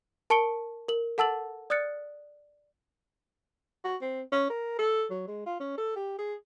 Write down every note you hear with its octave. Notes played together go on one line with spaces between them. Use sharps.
A#4 A5 C#6 C#7 D7 G7
A#4 F#7
A4 F#5 A5 E6 A6 F#7
D5 D#6 F6 F#6 A6 C#7
F#4
C4
C#4
A#4
A4
F#3
G#3
F4
C#4
A4
G4
G#4